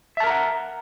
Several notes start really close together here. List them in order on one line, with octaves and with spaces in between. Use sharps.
E5 A5 A#4 A#5 F#5